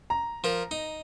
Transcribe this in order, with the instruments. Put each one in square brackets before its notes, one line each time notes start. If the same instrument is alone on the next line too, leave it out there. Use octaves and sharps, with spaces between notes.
[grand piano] A#5
[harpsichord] F3 A#4
D#4